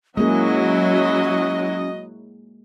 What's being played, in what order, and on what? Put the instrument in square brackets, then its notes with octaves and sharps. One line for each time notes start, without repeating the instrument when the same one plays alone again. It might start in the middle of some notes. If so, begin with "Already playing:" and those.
[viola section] F#3 E4 F#4 [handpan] G#3 A#3 G#4 [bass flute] C#4 [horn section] D#5